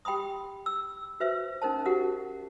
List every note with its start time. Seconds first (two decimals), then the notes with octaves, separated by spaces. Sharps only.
0.05 G4 G5 B5 C6 D#6
0.66 E6
1.20 F#4 B4 C5 E5
1.62 C#4 D#4 A#4 C5 A5
1.86 F#4 G4 A#4 F#5